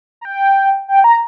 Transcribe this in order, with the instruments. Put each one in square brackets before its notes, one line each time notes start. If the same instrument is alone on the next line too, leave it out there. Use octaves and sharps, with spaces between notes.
[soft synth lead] A#5
G5
G5
A#5